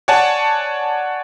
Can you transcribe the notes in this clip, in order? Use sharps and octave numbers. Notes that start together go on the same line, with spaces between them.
C#5 D5 F#5 G#5 A5